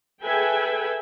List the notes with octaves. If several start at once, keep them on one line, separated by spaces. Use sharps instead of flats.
G#4 A4 B4 E5 G5 G#5